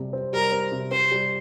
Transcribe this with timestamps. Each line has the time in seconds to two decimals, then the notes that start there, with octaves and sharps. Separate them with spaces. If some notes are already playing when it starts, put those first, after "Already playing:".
Already playing: C3 G3
0.13 C4
0.33 G3 A#4
0.52 C4
0.72 C3
0.91 C4 C5
1.12 G3